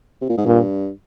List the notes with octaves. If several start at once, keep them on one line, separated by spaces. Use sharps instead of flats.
C3
A#2
G#2
G2 A#2